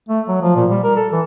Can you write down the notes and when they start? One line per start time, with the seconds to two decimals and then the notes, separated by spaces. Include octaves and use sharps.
0.09 A3
0.28 F#3
0.42 F3
0.56 A#2
0.70 G3
0.84 A#4
0.96 A4
1.12 E3